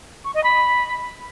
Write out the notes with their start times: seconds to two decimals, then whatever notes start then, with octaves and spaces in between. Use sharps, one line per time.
0.24 C#6
0.34 D#5
0.44 B5